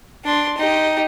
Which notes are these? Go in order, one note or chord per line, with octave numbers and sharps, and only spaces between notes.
D4 C6
D#4 G4